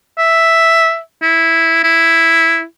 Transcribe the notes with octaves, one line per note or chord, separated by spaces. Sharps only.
E5
E4
E4